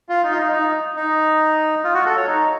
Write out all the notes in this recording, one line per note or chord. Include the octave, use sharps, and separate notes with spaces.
F4
D#4
F4
D#4
D#4
D#4
F4
F#4
A4
C#5
D#4